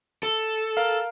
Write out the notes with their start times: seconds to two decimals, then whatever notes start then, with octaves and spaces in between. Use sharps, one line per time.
0.23 A4
0.77 A#4 F5